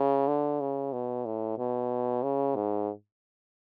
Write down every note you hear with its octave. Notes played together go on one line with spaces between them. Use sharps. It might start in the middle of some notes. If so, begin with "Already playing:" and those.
Already playing: C#3
D3
C#3
B2
A2
B2
C#3
G#2